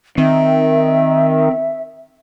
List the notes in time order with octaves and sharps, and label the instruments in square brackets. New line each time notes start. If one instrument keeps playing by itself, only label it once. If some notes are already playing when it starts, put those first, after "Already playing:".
[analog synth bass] D#3 [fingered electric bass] C4 [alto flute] E5